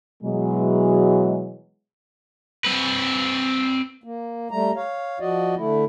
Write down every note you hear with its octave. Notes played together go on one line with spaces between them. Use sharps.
B2 E3 F#3 G#3
C4 B4
A#3
G3 A3 A#5
C#5 F5
F3 F#4 D5 D#5
D3 A3 E4